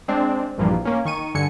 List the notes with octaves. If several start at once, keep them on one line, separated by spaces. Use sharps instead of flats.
G#3 C4 D4
A#1 G2 E3 F3 G3 A#3
A#3 C#4
D#3 C#6 D#7
G2 D3 G#5 C#7